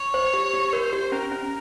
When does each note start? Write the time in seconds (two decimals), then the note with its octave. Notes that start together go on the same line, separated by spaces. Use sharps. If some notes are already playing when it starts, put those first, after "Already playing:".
Already playing: C#5
0.14 C5
0.34 G4
0.54 G4
0.72 A#4 C5
0.93 G4
1.12 C#4 A#4
1.32 C#4